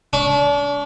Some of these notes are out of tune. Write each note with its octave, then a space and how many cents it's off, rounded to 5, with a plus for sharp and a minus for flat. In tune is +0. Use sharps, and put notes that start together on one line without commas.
D4 -35 C#6 +0